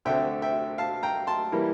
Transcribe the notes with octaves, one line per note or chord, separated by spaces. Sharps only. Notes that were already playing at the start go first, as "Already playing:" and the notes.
D2 D3 A3 C4 E5 G5
E5 G5
F5 A5
G5 A#5
A5 C6
E3 G3 A#3 E4